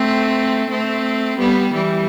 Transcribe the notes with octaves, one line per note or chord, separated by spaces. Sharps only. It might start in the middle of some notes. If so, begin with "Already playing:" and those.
Already playing: A3 C4
A3 C4
G3 B3
E3 G3